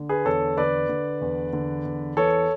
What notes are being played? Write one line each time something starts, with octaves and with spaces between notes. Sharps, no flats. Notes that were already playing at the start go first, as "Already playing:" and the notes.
Already playing: D3
G#4 B4
E2 A4 C#5
D3 B4 D5
D3
E2
D3
E2
E3 A4 C#5